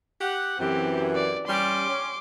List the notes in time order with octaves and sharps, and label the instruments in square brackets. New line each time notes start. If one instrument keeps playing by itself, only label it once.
[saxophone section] G4 F#5
[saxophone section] F#2 E3 [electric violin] C4 G4
[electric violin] D5
[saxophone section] G3 C#4 [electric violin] C6 D6
[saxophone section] C#4